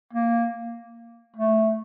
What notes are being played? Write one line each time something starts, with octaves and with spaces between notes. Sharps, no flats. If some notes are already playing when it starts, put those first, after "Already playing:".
A#3
A3